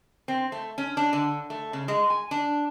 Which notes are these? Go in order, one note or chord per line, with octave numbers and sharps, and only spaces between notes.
C4
A3
C#4
D4
D3
A3
C#3
G#3
G#5
D4